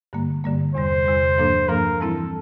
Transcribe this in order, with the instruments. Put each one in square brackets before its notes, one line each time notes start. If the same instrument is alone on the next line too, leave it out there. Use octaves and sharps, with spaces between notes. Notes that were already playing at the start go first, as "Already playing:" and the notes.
[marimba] G2 D3 G3 A#3
G2 D3 G3 A#3
[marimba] E2 C3 G3 [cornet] C5
[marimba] E2 C3 G3
G2 F3 A#3 D4 A4
[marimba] G2 F3 A#3 D4 A4 [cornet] A#4
[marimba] E3 G3 C4 E4 [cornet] A4